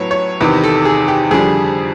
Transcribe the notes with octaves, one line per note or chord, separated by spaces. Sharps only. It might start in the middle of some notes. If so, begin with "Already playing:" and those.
Already playing: A2 F#3 B3 C#5
C#5
E2 C3 D#3 B4
A4
G#4
G4
F2 D3 G3 G#4